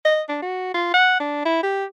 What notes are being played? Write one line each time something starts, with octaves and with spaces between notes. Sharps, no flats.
D#5
D4
F#4
F4
F#5
D4
E4
G4